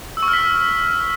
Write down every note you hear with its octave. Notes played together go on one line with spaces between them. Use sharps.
E6
C#6
F6
B6